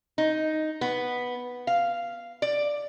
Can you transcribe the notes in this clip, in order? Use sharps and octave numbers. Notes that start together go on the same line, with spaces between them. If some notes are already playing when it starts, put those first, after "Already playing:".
D#4
B3
F5
D5